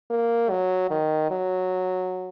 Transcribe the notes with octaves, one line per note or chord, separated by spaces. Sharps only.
A#3
F#3
D#3
F#3